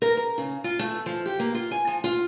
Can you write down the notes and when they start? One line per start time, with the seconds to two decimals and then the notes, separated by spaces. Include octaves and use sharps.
0.02 A#4
0.17 A#5
0.38 C#3
0.64 F4
0.79 A3
1.06 F3
1.26 G4
1.40 A#3
1.55 F4
1.71 G#5
1.87 F3
2.04 F4